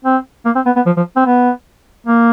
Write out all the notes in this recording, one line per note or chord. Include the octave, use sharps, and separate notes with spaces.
C4
A#3
C4
B3
B3
F3
F3
C4
B3
A#3